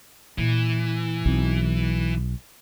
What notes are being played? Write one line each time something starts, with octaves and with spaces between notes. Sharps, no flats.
A#2 E3
B1 C4